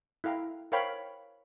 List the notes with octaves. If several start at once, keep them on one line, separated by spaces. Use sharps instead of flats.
E4 A4 F5 G5 A#5
A#4 C5 C#5 F5 G5 B5